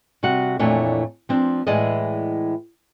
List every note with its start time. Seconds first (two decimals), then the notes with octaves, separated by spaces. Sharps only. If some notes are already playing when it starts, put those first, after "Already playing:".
0.23 C3 G3 F#4 F#5
0.59 F2 A#2 E3 A3 D4 C#5
1.29 F3 C4 D4
1.67 A2 E3 G#3 G#4 D5 D#5